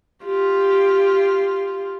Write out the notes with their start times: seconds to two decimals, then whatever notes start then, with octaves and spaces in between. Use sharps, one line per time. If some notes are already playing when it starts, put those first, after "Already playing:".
0.23 F4 G4